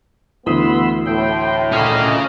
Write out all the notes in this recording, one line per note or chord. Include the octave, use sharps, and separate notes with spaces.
D2 E3 B3 B5 C6 D#6 E6
A2 G5 C6
A#2 C#4 D#5 F5 F6